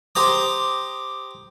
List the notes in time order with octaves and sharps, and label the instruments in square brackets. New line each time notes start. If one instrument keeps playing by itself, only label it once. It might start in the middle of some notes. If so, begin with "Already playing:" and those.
[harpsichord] G4 C5 A#5 D#6